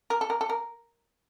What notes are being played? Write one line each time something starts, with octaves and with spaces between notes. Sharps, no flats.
A#4
A4
A#4
A4
A#4